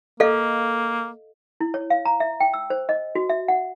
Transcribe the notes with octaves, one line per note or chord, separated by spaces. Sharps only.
A#3 A4 D#5 F5
E4
C#5
F5
A#5
E5
G5
E6
C5
D#5
F#4
E5
F#5